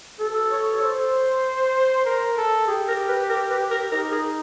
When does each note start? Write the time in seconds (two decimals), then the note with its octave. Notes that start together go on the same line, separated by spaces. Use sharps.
0.20 A4
0.51 C#5
0.81 C5
2.05 A#4
2.37 A4
2.67 G4 G#4
2.88 A#4
3.09 B4
3.29 A#4
3.50 B4
3.71 A#4
3.91 D#4 A#4
4.11 G#4